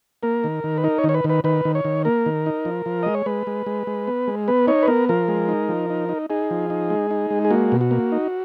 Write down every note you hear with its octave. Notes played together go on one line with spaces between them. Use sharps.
A#3 A#4
D#3
D#3
B4
D#4 A#4
C#5
D#3
C#5
B4
D#3
B4
D#3 B4
D#3
C#5
D#3
A#3 A#4
D#3
D#4
F3
F3
G#3 D#5
C#5
G#3 B4
G#3
G#3
G#3
B3
G#3
B3 B4
D#4 C#5
B4
B3 A#4
F3 A#4
G#3
D#4
F3
D#4
D#4
D#4 G#4
F3
D#4
G#3
D#4
G#3
G#4
A#3 F#4
B2
F#4
A#3
D#4